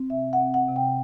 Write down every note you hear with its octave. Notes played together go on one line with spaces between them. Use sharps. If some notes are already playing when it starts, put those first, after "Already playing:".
Already playing: C4
C3 E5
F#5
C4
F#5
C3
G5